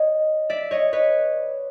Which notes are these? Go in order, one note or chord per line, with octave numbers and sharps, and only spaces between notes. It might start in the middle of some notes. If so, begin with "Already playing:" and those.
Already playing: C#5 D#5
D5 E5
C#5 D#5
B4 C#5